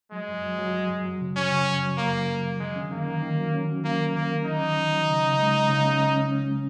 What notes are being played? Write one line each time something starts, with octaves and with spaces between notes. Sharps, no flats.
F#3 G#3
F#2
F#3
F#3
F#3
F#2
F#3
C#3
F#3 C#4
C#3
F#2
F#3
F#2 A#3
F#3
F#2
F#3
D#3 G#3
C#4
D#3 A#3
D#3
D#3
F#3
C#4
F#3
D#3 A#3
D#3
D#3 A#3
C#4
D#3 D#4
D#3
D#3
F#3
C#3
C#3
G#3
G#3
C#3
C#4
C#4
C#4
C#4
G#3